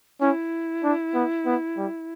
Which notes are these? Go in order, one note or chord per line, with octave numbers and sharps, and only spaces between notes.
C#4 E4
D4
B3
B3
G3